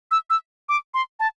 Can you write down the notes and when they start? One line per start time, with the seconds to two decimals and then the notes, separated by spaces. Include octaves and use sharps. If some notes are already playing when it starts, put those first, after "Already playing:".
0.11 E6
0.30 E6
0.69 D6
0.94 C6
1.20 A5